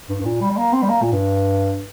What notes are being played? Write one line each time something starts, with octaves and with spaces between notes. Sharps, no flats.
G2
G2
A#2
G3
G3
A#3
C4
G3
A#3
A#2
G2